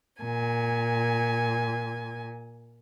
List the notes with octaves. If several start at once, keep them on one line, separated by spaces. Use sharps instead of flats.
A#2 G#5